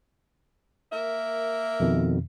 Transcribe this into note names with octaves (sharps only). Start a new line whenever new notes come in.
A#3 A#4 E5
F2 B2 D#3